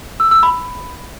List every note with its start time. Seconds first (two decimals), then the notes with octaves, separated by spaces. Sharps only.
0.20 E6
0.31 E6
0.43 B5